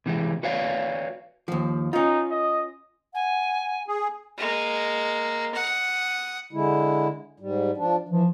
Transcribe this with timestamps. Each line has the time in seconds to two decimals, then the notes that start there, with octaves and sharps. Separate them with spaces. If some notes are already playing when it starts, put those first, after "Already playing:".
0.06 C3 E3 G#3
0.43 F#4 B4 C#5 D5 F5
1.48 D#2 F3
1.93 C#4 D#4 F4
2.31 D#5
3.14 F#5 G#5
3.88 G#4
4.37 G#3 A#3
5.54 F#5 D#6
6.53 D3 G#3 E4
7.40 G#2 G3
7.77 F3 D4
8.09 E3 F3